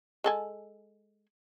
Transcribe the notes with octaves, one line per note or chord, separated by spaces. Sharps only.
G#3 A4 G#5